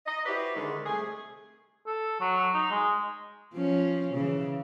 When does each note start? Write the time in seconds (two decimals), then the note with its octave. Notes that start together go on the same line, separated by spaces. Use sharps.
0.06 D#5
0.26 E4 F#4 G4 B4 C5 D5
0.55 D3 D#3 G#3
0.86 C3 G3 A3 G#4
1.87 A4
2.20 F#3
2.54 D#4
2.71 G#3
3.54 F3 C#4
4.14 C#3 E3